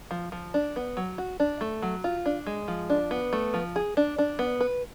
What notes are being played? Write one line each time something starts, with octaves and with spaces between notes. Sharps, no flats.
F3
F3
D4
B3
F#3
F#4
D4
A3
F#3
F4
D4
G#3
F3
D4
B3
A3
F3
G#4
D4
D4
B3
B4